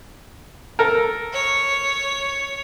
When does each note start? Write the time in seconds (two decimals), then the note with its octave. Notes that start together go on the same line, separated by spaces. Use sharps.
0.79 A4 A#4
1.32 C#5